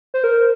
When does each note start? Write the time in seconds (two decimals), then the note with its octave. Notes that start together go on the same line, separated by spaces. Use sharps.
0.14 C5
0.24 A#4